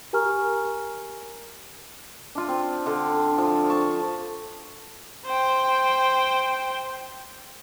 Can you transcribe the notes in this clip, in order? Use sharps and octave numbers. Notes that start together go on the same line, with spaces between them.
G4 A#4 G#5 A#5 C#6 F6
D4 F4
C4
D3 F5
F3
A5 C#6
C5 G5